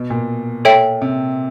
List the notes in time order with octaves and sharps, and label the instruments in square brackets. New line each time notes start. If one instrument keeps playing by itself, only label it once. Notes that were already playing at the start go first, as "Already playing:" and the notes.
Already playing: [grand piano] B2
A#2
[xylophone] A4 C#5 E5 G5
[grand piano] C3